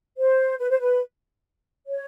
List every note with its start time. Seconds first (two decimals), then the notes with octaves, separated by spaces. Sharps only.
0.17 C5
0.59 B4
0.70 C5
0.80 B4
1.87 C#5